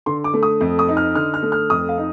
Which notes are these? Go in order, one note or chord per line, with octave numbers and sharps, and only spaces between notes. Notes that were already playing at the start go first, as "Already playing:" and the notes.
D3 C6
D6
A3
D#6
F2
D#6
D#4
F6
D3 F6
F6
A3
F6
F2 D#6
F5
D#4